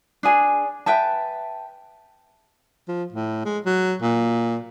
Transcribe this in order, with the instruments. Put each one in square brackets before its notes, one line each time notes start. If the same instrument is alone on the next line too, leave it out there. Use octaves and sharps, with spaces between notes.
[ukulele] D4 G#4 G#5
B4 E5 G5 A5
[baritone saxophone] F3
A2
G#3
F#3
A#2